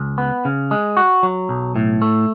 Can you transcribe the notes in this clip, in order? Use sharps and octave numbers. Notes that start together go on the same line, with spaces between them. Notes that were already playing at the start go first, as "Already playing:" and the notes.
Already playing: C#2
B3
C#3
G#3
F#4
F#3
B1
A2
A3